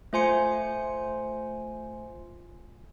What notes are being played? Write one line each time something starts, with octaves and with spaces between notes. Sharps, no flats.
A3 F4 C5 G#5 C6 C#7